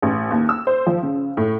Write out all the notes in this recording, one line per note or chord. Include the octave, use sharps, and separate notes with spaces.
A1
D#2
E6
C5
F3
C#3
A2